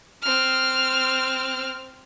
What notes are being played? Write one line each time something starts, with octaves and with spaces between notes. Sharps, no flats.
C4 F6